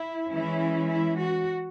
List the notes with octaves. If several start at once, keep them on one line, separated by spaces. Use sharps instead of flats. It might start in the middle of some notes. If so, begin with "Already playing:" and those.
Already playing: E4
E3 G#3 C#4 E4
E4
F#4